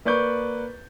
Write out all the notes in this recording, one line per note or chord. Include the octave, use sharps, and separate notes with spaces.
A#3 B4 D5 C#6 G6